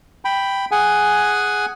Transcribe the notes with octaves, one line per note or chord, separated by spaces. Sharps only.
G5 B5
G#4 F#5 G#5